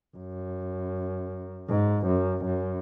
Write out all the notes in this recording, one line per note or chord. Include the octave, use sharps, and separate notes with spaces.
F#2
G#2
F#2
F#2